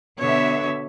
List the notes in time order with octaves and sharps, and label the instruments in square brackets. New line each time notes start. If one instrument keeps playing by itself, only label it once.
[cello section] B2 D3 E5 [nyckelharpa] C#5